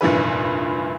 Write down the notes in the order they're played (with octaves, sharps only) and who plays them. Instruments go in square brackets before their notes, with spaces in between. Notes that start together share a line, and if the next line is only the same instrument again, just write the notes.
[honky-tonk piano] F1 G2 A#2 E3 B4